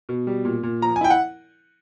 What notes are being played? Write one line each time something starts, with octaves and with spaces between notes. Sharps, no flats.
B2
G3
A#2
A#2
F3 A#5
G#5
E4 G5
F#5